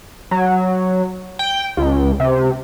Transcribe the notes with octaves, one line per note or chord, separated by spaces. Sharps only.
F#3
G5
C#2
C3